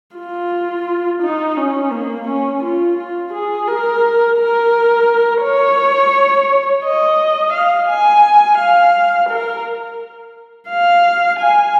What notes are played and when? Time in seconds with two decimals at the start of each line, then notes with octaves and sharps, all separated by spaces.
0.16 F4
1.22 D#4
1.57 C#4
1.92 A#3
2.28 C#4
2.63 F4
2.97 F4
3.33 G#4
3.68 A#4
4.38 A#4
5.42 C#5
6.84 D#5
7.53 F5
7.89 G#5
8.58 F5
9.29 A#4
10.69 F5
11.39 G#5